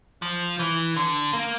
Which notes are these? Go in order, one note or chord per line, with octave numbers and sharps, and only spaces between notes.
F3
E3
D3
A#3